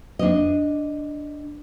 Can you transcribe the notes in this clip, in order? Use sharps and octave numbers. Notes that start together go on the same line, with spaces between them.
D4 D#5